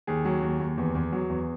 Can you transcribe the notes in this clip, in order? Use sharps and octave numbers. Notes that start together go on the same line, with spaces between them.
D#2 G#4
F#3
D#2
D#2
E2
E2
F#3
E2